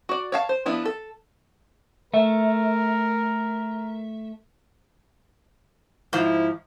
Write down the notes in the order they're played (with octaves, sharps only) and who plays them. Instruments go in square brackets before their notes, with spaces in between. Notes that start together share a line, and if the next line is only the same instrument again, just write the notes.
[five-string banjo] F#4 D5
C#5 F5 A5
C5
F3 B3 D4 E4
A4
[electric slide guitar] A3 E5 [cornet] A#4
[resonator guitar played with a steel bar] G#2 F3 [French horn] E4